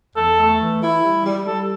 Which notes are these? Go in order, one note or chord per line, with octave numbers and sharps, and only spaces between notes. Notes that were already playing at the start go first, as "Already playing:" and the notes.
E2 A4
A3
E3
E4
G3
G3
G3 A4